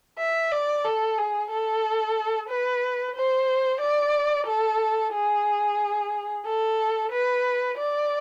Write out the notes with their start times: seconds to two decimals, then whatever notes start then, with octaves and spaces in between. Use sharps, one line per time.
0.19 E5
0.52 D5
0.85 A4
1.18 G#4
1.51 A4
2.49 B4
3.16 C5
3.81 D5
4.47 A4
5.13 G#4
6.46 A4
7.12 B4
7.78 D5